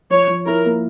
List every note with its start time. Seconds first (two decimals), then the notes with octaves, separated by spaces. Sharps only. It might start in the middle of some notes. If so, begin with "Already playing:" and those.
0.10 F3 C#5
0.28 F3
0.46 E4 A#4
0.65 A#3